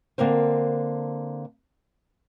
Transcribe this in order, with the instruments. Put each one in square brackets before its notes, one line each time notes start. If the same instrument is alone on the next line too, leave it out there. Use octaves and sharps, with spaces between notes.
[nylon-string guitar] D3 A#3 C4 A#4 C5